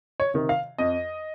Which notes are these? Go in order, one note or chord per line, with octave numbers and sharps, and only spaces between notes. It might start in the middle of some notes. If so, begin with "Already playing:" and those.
C#5
C3 D#3
F5
F2 D#5